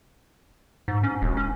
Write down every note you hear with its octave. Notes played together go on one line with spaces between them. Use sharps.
G#2
C#4
E1
C#4